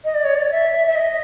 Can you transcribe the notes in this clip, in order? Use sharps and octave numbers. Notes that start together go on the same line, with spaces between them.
D#5
D5
C#5
D5
E5
E5
D#5